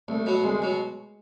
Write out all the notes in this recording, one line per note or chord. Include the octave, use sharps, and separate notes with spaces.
C2 A3
B2 F#3 B3
C2 G#3
B2 F#3